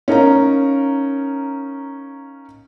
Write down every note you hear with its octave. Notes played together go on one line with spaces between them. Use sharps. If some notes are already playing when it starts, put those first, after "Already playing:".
C#4 D#4 A#4 F5 A#5